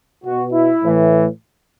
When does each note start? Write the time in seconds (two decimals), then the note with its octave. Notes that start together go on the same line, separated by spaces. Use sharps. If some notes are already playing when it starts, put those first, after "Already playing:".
0.24 B2 F#4
0.52 E4
0.81 A2 E3